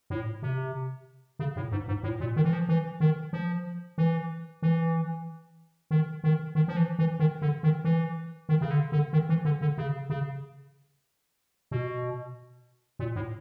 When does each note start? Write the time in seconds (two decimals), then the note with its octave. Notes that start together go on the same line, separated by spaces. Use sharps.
0.10 A2
0.42 C3
1.39 C#3
1.56 A2
1.72 G#2
1.88 G#2
2.03 A2
2.20 A#2
2.36 D#3
2.44 E3
2.53 F3
2.69 E3
3.00 D#3
3.33 F3
3.98 E3
4.62 E3
5.91 D#3
6.24 D#3
6.55 D#3
6.68 F3
6.77 E3
6.99 E3
7.19 D#3
7.42 D3
7.63 D#3
7.84 E3
8.49 D#3
8.61 C#3
8.71 D3
8.92 D3
9.13 D#3
9.29 E3
9.45 D3
9.61 D3
9.78 C#3
10.10 C#3
11.71 B2
12.99 A#2
13.16 A2